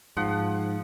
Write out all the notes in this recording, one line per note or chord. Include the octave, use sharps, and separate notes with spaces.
G#2 F3 F#5